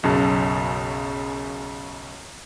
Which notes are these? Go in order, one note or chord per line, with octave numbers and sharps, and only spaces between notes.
B1 F#2 C#3 A5